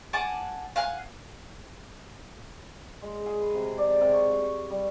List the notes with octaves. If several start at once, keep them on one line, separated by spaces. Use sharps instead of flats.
F#5 G#5 A5 D6
F5 F#5 G#5
G#3
G#4
B4
C3
D5
C3
C#6
G5
C#6
G3